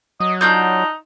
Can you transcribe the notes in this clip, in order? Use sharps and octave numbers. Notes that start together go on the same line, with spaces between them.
F#3 D#5
D4 D#4 F4 G6